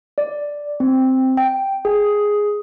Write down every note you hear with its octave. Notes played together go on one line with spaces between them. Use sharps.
D5
C4
G5
G#4